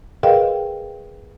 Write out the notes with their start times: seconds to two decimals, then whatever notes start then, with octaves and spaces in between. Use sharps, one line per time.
0.23 G#4 A#4 B4 D#5 F5 G5